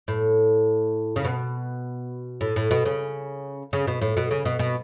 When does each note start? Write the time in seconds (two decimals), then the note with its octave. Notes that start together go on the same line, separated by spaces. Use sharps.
0.08 A2
1.16 C#3
1.25 B2
2.41 A2
2.56 A2
2.71 B2
2.85 C#3
3.73 C#3
3.87 B2
4.01 A2
4.17 B2
4.31 C#3
4.45 B2
4.59 B2